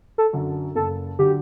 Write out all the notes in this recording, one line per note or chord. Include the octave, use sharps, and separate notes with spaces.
A4
F#2 D3 F#3
F#1 A4
D3 F#3 G4